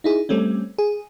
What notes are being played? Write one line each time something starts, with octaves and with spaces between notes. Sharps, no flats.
D#4 E4 G#4
G3 A3 C4 C#4
G#4